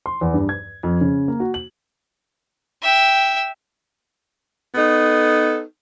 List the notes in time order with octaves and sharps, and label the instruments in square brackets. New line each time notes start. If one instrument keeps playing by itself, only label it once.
[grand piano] C6
E2
G2
G#6
F2
C#3
A#3
F#4
F#7
[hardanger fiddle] E5 G5
[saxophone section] B3 D#4 A4